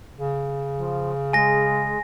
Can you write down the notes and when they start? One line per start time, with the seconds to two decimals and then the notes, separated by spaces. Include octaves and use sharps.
0.18 C#3
0.77 F3
1.33 G#3 G#5 A#6